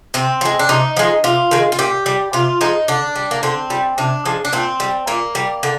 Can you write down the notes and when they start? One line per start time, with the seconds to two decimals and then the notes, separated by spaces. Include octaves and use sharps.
0.14 C3 C4
0.41 F3
0.45 G#3
0.59 D4
0.69 C3 D#4
0.97 F3 G#3
1.24 C3 F4
1.51 D#3 G#3
1.72 F4
1.79 A#2 G4
2.06 G3
2.33 C3 F4
2.61 F3 G#3 D#4
2.88 D3 D4
3.16 G3
3.31 A#3
3.43 D3 C4
3.70 G3
3.98 C3 D4
4.25 F3 G#3
4.45 D4
4.53 A#2 C4
4.80 G3
5.07 A#2 A#3
5.35 G3
5.63 D3